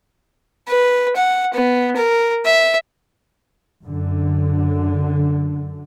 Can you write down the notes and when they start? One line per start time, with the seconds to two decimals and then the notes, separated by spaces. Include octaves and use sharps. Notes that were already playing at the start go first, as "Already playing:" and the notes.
0.68 B4
1.16 F#5
1.54 B3
1.96 A#4
2.45 E5
3.85 F#2 D3